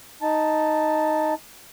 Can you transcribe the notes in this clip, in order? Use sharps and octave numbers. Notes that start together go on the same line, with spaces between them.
D#4 A5